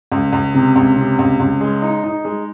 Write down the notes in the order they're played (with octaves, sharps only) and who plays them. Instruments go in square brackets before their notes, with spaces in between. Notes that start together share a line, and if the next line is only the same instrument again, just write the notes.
[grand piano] C#2
C#2
C3
C#2
C3
C#2
C#2
G#3
D#4
D#4
G#3